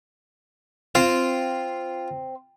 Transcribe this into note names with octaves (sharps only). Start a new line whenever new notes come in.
C4 F4